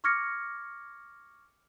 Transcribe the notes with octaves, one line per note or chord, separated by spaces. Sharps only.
C#6 D6 F6 G#6 A#6 C#7